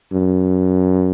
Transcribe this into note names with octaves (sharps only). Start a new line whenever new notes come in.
F#2